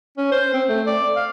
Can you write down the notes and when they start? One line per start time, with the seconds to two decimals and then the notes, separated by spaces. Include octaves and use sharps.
0.18 C#4
0.32 C5
0.54 C4
0.69 A3
0.87 D5
1.16 F5